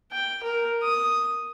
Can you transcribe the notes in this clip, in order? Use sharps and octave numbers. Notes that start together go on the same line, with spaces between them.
G5
A#4
D#6